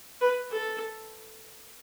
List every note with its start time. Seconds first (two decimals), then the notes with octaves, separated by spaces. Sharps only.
0.21 B4
0.52 A4